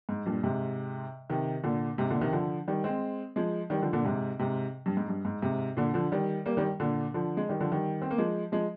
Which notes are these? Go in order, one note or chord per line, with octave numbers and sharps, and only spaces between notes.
G#2
G2 A#2
G#2 C3
C3 D#3
A#2 D3
G#2 C3
A#2 D3
C3 D#3
D3 F3
D#3 G3
G#3 C4
F3 G#3
D#3 G3
D3 F3
A#2 D3
G#2 C3
G#2 C3
G2
G#2
G2
G#2
G#2 C3
A#2 D3
D3 F3
D#3 G3
G3 A#3
D#3 G3
A#2 D3
D3 F3
G#3
D#3 G3
D3 F3
D#3 G3
C4
A#3
F3 G#3
F3 G#3